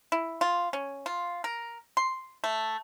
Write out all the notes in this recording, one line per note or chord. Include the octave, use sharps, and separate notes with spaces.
E4
F4
C#4
F4
A#4
C6
A3